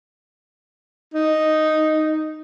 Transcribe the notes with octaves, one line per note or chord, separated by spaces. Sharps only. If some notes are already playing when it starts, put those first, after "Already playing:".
D#4